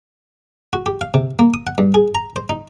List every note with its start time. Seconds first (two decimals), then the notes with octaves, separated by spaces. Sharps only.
0.73 F#4
0.86 G4
1.01 F5
1.14 C3
1.39 A#3
1.54 D#6
1.67 F#5
1.78 G2
1.94 G#4
2.15 A#5
2.36 C5
2.49 D#4